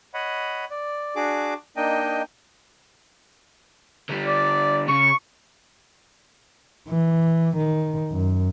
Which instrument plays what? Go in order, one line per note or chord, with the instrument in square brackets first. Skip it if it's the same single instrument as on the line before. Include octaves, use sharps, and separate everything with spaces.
[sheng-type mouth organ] C#5 D#5 F#5 B5
D5
D4 F#4 G#4 D6
A#3 D4 D#4 D#5 G5
[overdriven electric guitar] D3 G3
[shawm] D5
[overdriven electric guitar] C#3 [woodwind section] C#6
[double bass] E3
D#3
F#2